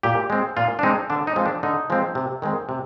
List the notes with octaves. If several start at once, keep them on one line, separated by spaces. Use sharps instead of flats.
A#2 G4
G#3 C4
A#2 F4
D4
G#3 C4 D#4
D3 D4
D#4
F3 G#3 C4
D4
D3 D#4
F3 G#3 C4
C3
D#3 G#3 C4
C3